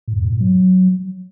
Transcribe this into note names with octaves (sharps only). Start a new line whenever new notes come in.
A2
F2
A#2
G2
F#3